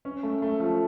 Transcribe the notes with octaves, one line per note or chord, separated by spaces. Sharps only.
C#4
A3
A3
F3